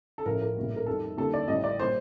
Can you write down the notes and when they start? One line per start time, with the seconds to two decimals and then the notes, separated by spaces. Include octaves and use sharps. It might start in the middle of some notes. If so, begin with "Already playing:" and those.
0.18 A4
0.25 A1 A2 F3 A#4
0.42 A#4
0.56 A#1 A2 G3
0.76 A#4
0.86 F2 D#3 G3 A4
1.17 D#2 D3 G3 A4
1.34 D5
1.48 A1 A2 G3 D#5
1.64 D5
1.80 A#2 G3 C5